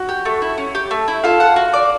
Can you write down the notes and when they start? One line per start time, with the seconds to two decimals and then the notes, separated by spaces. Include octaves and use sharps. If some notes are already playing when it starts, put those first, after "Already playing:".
Already playing: F#4 F#5
0.09 G4
0.25 A3
0.42 E4
0.58 C#4
0.75 G4
0.91 A3
1.08 E4
1.24 F4 A4 F5
1.40 F#5
1.56 F#4
1.73 D5